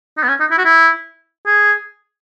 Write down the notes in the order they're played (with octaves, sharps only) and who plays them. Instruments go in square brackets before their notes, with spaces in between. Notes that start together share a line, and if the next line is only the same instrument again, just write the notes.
[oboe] D#4
B3
C#4
D#4
E4
F#4
E4
G#4